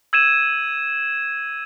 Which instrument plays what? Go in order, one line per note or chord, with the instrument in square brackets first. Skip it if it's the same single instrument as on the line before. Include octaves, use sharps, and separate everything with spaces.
[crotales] E6 G#6 D#7 E7